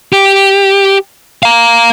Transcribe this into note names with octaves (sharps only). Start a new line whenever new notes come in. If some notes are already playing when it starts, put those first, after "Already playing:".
G4
F5 A#5